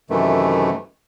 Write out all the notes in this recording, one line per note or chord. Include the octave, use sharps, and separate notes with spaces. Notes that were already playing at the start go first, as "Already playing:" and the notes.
F#2 C3 D#3 E3 A3